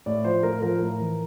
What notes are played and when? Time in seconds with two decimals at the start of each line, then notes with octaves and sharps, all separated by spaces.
0.06 A2 D5
0.24 F3 C5
0.43 A2 A#4
0.62 F3 A#4
0.81 A2
0.99 E3